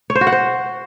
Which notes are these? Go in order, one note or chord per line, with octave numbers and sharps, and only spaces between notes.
C#5
C5
F#4
F#5
C5